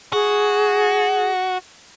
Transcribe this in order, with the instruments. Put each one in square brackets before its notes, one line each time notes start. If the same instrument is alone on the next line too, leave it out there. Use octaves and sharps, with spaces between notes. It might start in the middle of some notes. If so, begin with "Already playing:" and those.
[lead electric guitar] F#4 [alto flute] G#4